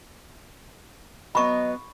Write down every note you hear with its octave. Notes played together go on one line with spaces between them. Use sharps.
F#3 B3 D#5 B5 C#6